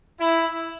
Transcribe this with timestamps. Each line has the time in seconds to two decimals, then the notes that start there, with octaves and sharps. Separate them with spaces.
0.19 E4